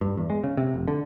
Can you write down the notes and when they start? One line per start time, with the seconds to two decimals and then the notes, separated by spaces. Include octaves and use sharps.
0.01 G2
0.17 E2
0.30 G#3
0.44 C#3
0.57 C3
0.74 F1
0.88 D3